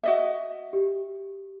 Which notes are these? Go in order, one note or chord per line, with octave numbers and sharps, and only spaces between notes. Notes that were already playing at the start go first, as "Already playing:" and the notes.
F#4 D#5 E5
G4